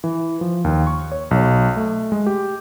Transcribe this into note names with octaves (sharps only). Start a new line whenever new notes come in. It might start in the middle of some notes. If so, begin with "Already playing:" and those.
E3
F3
D#2
C#6
C#5
B1
A3
G#3
G4